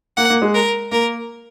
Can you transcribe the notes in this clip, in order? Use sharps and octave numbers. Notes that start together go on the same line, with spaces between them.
A#3 F#5
A#3
G#3
A#4
A#3 A#4